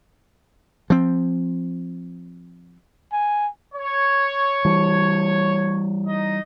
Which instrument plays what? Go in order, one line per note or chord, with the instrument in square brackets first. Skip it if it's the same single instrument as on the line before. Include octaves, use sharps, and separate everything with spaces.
[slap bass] F3 C4
[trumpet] G#5
[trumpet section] C#5
[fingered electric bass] E3 G3
[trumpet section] D#4 D#5